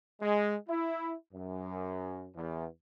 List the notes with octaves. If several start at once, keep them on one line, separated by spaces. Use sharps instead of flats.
G#3
E4
F#2
E2